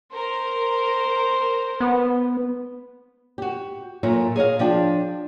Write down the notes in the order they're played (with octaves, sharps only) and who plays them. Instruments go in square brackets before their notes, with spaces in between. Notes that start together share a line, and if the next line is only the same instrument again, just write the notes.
[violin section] A#4 [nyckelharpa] C5
[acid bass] B3
[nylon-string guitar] F#4 G4
A#2 F#3 A3 F4
G#4 C#5 D#5 F5
F3 D4 G5 A5